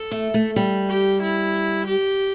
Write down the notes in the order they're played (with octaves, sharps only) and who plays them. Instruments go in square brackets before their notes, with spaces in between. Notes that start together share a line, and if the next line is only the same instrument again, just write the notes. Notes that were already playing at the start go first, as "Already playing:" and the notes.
Already playing: [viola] A4
[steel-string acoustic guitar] A3
A3
G3
[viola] G4
E4
G4